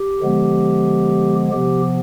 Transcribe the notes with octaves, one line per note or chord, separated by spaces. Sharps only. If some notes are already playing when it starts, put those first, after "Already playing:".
Already playing: G4
D3 F3 G#3 B3
C3 F3 B3 G4